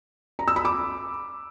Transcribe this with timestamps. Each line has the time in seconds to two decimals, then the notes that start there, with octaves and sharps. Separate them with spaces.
0.39 A#5
0.48 E6
0.56 B5
0.65 D6